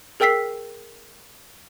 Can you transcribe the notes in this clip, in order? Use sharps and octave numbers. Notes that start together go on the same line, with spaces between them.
G#4 A#4 G5 E6 B6 C7